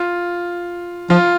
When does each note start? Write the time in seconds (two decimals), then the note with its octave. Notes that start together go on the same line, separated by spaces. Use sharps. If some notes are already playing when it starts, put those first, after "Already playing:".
Already playing: F4
1.10 F3 F4